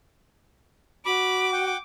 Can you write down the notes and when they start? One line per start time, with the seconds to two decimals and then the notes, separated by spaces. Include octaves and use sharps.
1.06 F#4 B5 D6
1.53 F#5 G5